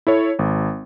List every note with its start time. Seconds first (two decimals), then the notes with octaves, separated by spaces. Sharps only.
0.07 E4 A4 C#5
0.39 G#1